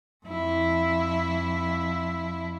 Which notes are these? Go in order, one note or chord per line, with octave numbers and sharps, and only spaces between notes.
F2 E4